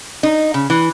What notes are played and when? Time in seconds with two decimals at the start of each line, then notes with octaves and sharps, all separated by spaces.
0.23 D#4
0.54 C#3
0.70 E3